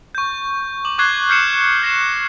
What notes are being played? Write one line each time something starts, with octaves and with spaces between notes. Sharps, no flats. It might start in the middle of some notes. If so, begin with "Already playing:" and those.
C#6 G6
D6 F#7
C#6 D6 F#6 G#6 C7 G7
F6 G6 C7 C#7 E7
G6 A#6 C7 E7